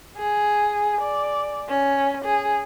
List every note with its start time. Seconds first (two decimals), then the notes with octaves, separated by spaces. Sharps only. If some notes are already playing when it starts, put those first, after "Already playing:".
0.17 G#4
1.01 D5
1.69 C#4
2.25 G#4